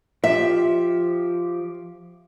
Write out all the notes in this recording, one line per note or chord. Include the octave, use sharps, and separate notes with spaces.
F3 G4 E5